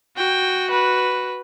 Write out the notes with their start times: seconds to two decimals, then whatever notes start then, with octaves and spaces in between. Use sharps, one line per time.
0.17 F#4 G5
0.70 B4